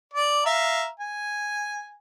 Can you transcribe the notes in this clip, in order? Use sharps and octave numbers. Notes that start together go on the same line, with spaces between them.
D5
E5 F5 A#5
G#5